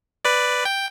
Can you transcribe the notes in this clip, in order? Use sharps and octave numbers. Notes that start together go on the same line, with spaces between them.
B4 D5
G5